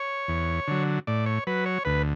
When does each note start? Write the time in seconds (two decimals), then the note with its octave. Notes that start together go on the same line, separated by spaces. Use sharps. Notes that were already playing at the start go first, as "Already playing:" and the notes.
Already playing: C#5
0.28 E2
0.67 D3 F#3
1.07 A2 D5
1.26 C#5
1.47 F#3 B4
1.66 C#5
1.85 D2 B4